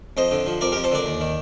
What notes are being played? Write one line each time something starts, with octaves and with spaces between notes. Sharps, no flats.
F2 C5 D#5
D3
F3
F2 A#4 D5
F2 G4 A#4
A4 C5
D3 A#4 D5
D#2
D#3